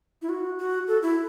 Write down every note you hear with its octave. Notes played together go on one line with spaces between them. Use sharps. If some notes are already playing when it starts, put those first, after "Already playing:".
E4
F#4
F#4
A4
E4